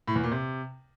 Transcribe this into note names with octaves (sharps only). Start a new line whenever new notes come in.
A2
E2
A#2
C3